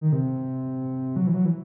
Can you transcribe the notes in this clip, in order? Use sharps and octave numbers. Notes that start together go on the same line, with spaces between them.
D#3
C3
F#3
E3
F#3
E3